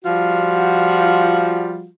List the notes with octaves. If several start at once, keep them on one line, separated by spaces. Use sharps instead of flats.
F3 G3 F4 F#4